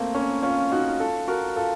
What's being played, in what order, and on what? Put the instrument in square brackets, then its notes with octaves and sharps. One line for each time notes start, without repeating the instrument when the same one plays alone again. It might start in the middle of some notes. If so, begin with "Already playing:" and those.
Already playing: [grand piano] A3 A#3 C4
A#3 C#4
C#4 F4
D#4 F#4
F4 A4
F#4 A#4
F4 A4